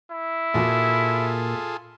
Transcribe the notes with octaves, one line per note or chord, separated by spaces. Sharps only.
E4
A#2 F4 F#4 G#4 A4 A5